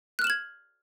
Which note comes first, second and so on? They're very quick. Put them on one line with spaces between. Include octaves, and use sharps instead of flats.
F#6 F6 E7 F#7 G#6